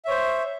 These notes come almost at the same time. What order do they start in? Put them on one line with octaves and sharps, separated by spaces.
E5 C#5 C5